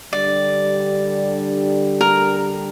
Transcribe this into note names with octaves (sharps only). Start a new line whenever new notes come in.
D3 G3 D4 G4 D5
A#4